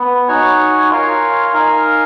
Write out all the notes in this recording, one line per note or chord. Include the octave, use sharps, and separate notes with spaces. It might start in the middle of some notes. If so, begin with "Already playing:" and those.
Already playing: B3
D#4 F#4 C#5 G#5
F4 A#4 C#5 F5 G#5
D#4 A#4 F5 G#5